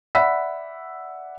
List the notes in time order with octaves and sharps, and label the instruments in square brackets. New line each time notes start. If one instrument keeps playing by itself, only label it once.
[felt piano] D5 E5 F#5 B5 E6 B6